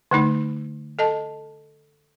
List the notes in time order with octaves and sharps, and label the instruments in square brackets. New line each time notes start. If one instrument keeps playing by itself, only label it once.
[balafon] D3 A3 D#4
A4 D#5 A5